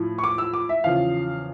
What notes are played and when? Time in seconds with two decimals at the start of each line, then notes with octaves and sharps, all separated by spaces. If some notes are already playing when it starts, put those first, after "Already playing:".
Already playing: A2 F3
0.18 C#6
0.24 D6
0.38 E6
0.54 D6
0.69 E5
0.84 E2 C#3 F3 F5